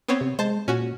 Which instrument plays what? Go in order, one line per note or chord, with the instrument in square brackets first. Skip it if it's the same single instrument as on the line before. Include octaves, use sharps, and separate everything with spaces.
[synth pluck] B3 C4 C#5
[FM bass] C3
[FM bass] G#3 [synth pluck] C5 A5
[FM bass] A#2 [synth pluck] C#4 F#4